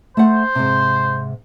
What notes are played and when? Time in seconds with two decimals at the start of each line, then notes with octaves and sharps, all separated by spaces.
0.17 A3 C5 F#5
0.55 G#2 C3